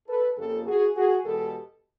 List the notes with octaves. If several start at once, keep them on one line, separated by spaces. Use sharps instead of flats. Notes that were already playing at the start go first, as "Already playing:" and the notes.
A4 B4
F2 C#3 F3 A#3 G4 A4
F#4 G#4
F#4 G#4
E2 B2 G#3 G4 A4